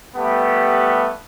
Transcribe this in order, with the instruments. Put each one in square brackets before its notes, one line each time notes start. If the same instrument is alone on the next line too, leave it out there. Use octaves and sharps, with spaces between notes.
[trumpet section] G3 A3 B3 G4